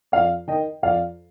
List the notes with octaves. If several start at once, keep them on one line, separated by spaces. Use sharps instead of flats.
F2 D5 F5
D#3 D#5 G5
F2 D5 F5